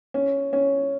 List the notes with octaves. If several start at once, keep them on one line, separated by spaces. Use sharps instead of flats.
C#4
C#4